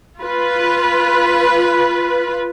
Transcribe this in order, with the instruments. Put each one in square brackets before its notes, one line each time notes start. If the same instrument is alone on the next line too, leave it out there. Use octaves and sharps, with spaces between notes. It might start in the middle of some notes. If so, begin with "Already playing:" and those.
[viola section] F4 B4